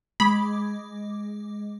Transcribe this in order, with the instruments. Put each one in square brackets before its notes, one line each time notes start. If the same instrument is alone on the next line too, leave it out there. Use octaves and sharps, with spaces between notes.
[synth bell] G#3 D6 [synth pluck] B5